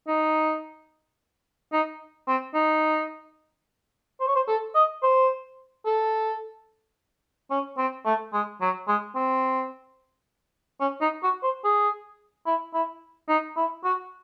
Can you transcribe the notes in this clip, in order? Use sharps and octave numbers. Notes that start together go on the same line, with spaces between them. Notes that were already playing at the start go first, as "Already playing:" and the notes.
D#4
D#4
C4
D#4
C5
C#5
C5
A4
D#5
C5
A4
C#4
C4
A3
G#3
F#3
G#3
C4
C#4
D#4
F#4
C5
G#4
E4
E4
D#4
E4
F#4